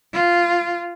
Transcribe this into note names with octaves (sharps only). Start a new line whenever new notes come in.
F4